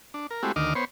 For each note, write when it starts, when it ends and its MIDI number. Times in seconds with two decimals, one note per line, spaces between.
0.14 0.27 62
0.31 0.43 70
0.43 0.52 56
0.43 0.52 57
0.43 0.52 60
0.43 0.52 64
0.43 0.52 66
0.43 0.52 67
0.56 0.74 38
0.56 0.74 51
0.56 0.74 75
0.56 0.74 86
0.56 0.74 89
0.75 0.85 59
0.75 0.85 72
0.75 0.85 73